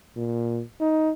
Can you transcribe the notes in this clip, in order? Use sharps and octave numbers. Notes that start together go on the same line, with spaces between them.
A#2
D#4